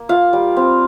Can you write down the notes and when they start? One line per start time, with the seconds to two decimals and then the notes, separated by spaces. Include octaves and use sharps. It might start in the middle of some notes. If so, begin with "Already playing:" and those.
Already playing: A#3
0.09 F4 F5
0.33 G3
0.56 C4